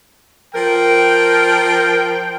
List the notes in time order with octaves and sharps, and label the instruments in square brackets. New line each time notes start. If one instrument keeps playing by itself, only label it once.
[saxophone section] F3 A#4 [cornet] G5